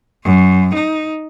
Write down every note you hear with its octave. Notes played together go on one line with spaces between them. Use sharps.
F#2
D#4